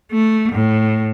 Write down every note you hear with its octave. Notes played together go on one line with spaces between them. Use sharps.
A3
A2